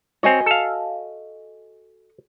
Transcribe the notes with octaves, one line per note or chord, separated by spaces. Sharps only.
C4 F#4 C#5 D#5 G#5
A4 F5